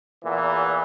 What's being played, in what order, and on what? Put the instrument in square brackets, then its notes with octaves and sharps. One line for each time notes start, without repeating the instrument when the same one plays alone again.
[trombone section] E2 A#2 E3